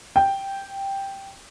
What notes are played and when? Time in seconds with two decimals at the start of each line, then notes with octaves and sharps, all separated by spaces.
0.16 G5